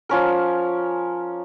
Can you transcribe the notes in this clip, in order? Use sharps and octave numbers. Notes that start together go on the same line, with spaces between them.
F3 C#4 A#4